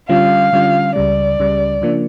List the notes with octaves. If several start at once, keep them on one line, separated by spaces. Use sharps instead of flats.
D3 G3 C#4 F4 F5
D3 G3 C#4 F4
C#2 C#3 G3 D5
C#2 C#3 G3
C#3 F3 A#3 D4